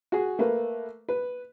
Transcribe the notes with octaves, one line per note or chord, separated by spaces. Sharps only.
F#4 G#4
A3 A#3 B4
B4